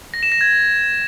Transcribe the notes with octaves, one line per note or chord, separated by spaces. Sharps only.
A#6
E7
A#6
G#6